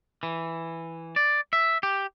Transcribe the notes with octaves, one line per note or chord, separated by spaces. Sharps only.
E3
D5
E5
G4